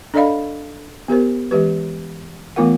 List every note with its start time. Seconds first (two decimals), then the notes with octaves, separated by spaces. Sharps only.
0.14 D4 A4 D5 D#5 F5 B5
1.08 B3 G4 A#4 C5
1.51 E3 G#3 G4 B4
2.56 E3 A3 B3 F4 A#4 F#5